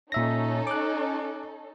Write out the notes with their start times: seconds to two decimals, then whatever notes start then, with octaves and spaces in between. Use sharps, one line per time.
0.12 A#2 C#4 D#4 A4 E5 A#6
0.67 D6 F#6